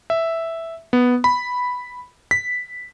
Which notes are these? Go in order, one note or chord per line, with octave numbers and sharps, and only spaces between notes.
E5
B3
B5
B6